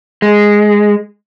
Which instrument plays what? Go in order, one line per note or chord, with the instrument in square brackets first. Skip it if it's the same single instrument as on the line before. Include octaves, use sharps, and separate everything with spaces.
[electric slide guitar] G#3